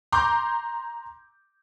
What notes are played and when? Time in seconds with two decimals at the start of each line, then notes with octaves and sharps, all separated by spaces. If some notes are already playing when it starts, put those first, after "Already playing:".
0.12 A#5 C6 D6 G6